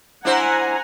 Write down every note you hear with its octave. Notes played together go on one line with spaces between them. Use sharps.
D4 E4 C5 F#5 G#5 A#5